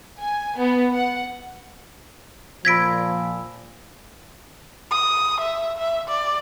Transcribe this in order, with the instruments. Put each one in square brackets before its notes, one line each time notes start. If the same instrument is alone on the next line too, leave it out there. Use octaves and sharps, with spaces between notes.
[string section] G#5
B3
F#5
[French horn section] A#2 F3 [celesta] B5 E6 A#6 [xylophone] G#6 B6 D7
[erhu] D#6
E5
E5
D5